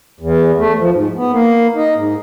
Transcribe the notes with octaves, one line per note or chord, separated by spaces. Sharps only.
E2
A3
F3
G#2
B3
A#3
D#4
G#2